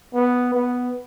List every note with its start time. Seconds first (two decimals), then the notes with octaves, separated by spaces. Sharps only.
0.13 B3
0.54 B3